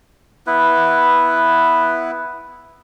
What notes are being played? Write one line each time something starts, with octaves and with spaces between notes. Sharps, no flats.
B3 E4 B4